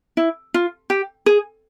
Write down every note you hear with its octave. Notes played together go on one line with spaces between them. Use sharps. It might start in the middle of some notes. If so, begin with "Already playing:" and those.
E4
F4
G4
G#4